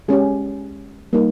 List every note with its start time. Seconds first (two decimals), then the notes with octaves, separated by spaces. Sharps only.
0.08 G#3 C#4 G4 G#4
1.13 G3 A#3 D#4